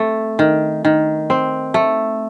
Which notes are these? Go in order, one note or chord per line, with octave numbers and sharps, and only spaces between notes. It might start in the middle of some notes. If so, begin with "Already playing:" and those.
Already playing: A3 C4
D#3
D#3
C4
A3